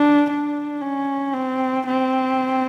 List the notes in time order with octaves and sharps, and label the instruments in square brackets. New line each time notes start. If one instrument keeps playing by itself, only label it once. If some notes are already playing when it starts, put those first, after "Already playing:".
Already playing: [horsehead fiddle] D4
D4
C#4
C4
C4